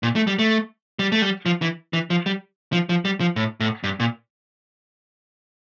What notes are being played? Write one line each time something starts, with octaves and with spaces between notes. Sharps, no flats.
A#2
A3
G3
A3
G3
A3
G3
F3
E3
E3
F3
G3
F3
F3
G3
F3
A2
A2
G2
A#2